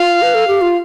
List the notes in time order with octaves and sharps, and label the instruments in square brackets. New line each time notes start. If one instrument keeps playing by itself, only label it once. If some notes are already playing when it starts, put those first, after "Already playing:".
Already playing: [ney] F4 [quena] F5
[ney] B4
A4
G4
F4